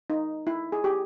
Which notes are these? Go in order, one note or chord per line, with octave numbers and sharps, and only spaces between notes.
D#4
E4
G#4
G4